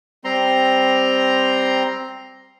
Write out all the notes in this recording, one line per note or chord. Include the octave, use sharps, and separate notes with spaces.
G3 C4 A#5 C6